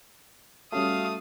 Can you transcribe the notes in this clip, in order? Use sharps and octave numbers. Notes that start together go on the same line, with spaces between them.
G3 A3 C#4 F#4 F5 D#6